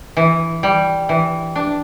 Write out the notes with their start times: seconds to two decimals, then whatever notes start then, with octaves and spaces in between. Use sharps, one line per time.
0.17 E3
0.63 G3
1.09 E3
1.55 D4